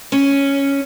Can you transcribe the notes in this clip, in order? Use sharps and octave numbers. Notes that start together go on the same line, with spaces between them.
C#4